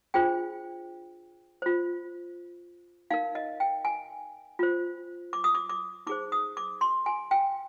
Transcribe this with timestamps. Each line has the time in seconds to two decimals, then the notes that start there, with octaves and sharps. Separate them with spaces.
0.14 D4 F4 G#4 C5 G5
1.62 F4 C5
3.10 D#4 A#4 F5
3.35 D#5
3.60 G5
3.85 G#5
4.59 F4 C5
5.33 D6
5.44 D#6
5.55 D6
5.70 D6
6.07 D#4 G#4 C5 D6
6.32 D#6
6.57 D6
6.81 C6
7.06 G#5
7.31 G5